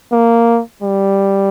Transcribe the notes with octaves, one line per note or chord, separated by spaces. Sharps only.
A#3
G3